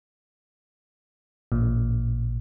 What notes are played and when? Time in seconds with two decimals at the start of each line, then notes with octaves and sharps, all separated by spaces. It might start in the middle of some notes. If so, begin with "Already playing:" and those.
1.52 A1 A#2